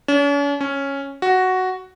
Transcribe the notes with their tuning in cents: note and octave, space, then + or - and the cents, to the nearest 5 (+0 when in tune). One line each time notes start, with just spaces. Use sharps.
C#4 +45
C#4 -5
F#4 +5